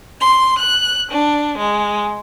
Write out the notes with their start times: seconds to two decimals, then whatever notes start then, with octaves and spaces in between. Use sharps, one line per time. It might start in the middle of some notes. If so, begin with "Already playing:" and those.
0.20 C6
0.58 F#6
1.11 D4
1.58 G#3